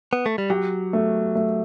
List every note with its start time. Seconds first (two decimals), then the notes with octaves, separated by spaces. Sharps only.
0.13 B3
0.26 A3
0.38 G3
0.50 F#3 G4
0.93 A3
1.35 A3